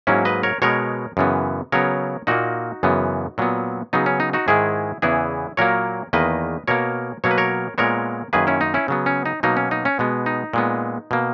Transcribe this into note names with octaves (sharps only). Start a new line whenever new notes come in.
G#2 F#3 A#3 C#4 E4
B4 D#5
A#4 C#5
B2 G#3 B3 A#4 C#5
F#2 C#3 E3 B3
C#3 F#3 B3 A#4 C#5
A#2 A#3 D#4 F#4
F#2 C#3 E3 B3
A#2 F#3 B3
C#3 F#3 B3 D#4
C#4
D#4
D#4 F#4
G#2 D#3 G#3 E4 G#4
E2 C#3 E3 B3 E4 G#4
A#2 F#3 A#3 A#4 C#5
E2 D#3 A#3 B4 D#5
B2 A#3 A#4 C#5
B2 F#3 A#3 C#5
B4
A#4 C#5
A#2 G#3 B3 A#4 C#5
F#2 D#3 A#3 G#4 B4
C#4 E4
D#4
C#4 E4
C#3 F#3 B3
C#4
D#4
B2 F#3 A#3 D#4
C#4
D#4
C#4
B2 G#3 B3
D#4
A#2 G#3 B3
B2 A#3